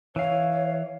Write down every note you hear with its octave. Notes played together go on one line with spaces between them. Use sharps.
E3 C#5 F5